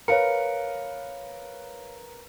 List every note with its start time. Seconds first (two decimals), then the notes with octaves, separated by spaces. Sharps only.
0.08 A#4 B4 C#5 F5 C#7